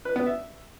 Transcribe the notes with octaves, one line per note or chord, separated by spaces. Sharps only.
B4
B3
E5